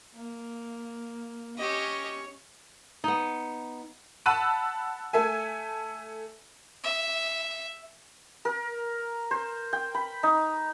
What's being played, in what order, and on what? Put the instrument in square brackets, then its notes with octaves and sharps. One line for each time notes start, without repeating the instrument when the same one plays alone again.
[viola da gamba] A#3
[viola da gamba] C#4 C#5 [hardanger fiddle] G4 D#5
[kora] B3 D#4
[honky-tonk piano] F#5 A5 B5 E6 F#6 D#7
A3 A4 E5 G#5
[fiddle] E5
[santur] A#4
C5
G5
B5
D#4